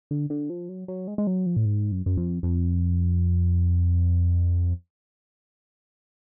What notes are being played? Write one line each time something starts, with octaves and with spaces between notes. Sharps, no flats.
D3
D3
F3
F#3
F#3
G#3
G#3
F#3
F3
A2
G#2
F#2
F#2
F2
F2